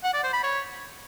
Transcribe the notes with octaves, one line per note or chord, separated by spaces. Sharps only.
F#5
D5
C5
B5
C#5